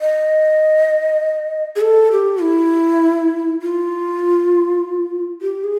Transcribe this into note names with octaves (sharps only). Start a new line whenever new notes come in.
D#5
G#4
A4
G4
E4
F4
G4
G#4